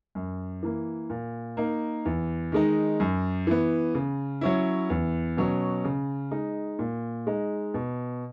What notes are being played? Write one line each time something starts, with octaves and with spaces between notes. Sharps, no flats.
F#2
E3 A#3
A#2
A#3 D#4
E2
D#3 G#3 D#4
F#2
E3 B3
C#3
F#3 C#4 E4
E2
B2 F#3 C#4
C#3
G#3 D#4
A#2
G#3 D#4
B2